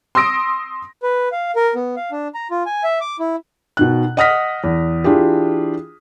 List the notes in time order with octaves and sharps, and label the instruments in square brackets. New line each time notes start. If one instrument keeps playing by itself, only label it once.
[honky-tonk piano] C6 D#6 E6 A#6 D7
[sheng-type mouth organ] B4
F5
A#4
B3
F5
D4
A#5
F4
G#5
E5
D6
E4
[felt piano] B2 D#3 F#6
D#5 F#5 D#6 F6 A#6 B6
E2
E3 D4 F4 G4 G#4